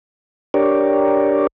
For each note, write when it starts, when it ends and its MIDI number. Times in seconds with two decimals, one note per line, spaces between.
0.54 1.47 62
0.54 1.47 67
0.54 1.47 70
0.54 1.47 73
0.54 1.47 74